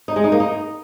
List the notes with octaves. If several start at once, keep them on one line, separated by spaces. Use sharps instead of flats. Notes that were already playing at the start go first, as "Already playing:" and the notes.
D#4
G#3
D#4
A#3
D#4